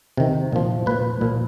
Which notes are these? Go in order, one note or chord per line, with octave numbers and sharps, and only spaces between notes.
C3 D#3
A#2 F3
A#2 F3 B4
A#2 F3